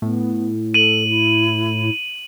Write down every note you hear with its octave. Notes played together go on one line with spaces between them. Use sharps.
A2 B3
A4 D#7 F#7
E4